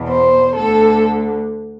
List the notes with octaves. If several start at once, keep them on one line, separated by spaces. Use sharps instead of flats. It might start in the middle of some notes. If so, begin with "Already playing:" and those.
Already playing: E2 B2
C5
D2 D3 A4